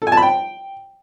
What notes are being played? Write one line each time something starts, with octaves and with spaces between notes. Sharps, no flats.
A4
G#5
A5
B5
G5